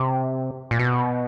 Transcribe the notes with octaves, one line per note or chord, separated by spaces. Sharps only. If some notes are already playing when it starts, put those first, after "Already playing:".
Already playing: C3
A#2
B2